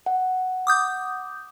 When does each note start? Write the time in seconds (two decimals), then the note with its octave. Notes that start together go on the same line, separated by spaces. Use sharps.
0.06 F#5
0.67 D6 D#6 G6